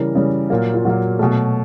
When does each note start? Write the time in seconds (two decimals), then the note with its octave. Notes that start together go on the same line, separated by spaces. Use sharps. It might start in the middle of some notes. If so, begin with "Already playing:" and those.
Already playing: C#3 E3 G3 A#4
0.15 C#3 E3 G3
0.50 A#2 F#3 A#3
0.74 F4
0.85 A#2 F#3 A#3 F#4
1.19 B2 F#3 A3